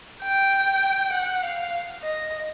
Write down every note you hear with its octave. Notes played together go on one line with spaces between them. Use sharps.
G5
F#5
F5
D#5